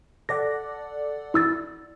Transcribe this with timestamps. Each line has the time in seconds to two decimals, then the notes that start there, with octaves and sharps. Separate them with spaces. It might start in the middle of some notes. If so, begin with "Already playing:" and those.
0.29 A4 D5 F#5 A#6
1.34 E4 E6 A6